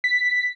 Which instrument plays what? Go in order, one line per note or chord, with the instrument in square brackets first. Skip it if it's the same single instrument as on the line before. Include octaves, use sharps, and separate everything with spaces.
[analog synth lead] B6